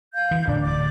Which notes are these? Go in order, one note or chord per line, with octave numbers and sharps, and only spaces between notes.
F5 G6
E3
D1 D4 D5
D5 D6